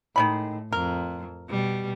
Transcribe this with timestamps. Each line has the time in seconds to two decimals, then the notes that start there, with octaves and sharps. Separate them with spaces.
0.16 A2 D#3 G#3 B5
0.73 F2 A#4
1.50 B2 G3